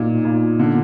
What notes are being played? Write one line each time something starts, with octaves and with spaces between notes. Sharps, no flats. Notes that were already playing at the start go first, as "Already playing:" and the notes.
Already playing: A#2 D#4
A#2
D3